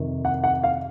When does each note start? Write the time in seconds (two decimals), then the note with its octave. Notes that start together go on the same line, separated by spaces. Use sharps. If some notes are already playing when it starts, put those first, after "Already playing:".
Already playing: F2 C3 D#3
0.25 F#5
0.44 F#5
0.64 F5